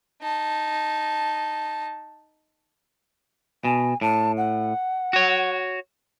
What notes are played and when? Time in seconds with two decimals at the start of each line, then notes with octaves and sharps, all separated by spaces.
0.22 D#4 A5
3.65 B2 G#5
4.01 A2 A5
4.37 F#5
5.13 F#4 C#5